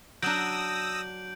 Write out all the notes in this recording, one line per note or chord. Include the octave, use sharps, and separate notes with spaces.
F#3 D4 D#6 E6 G6 A#6 D7 F#7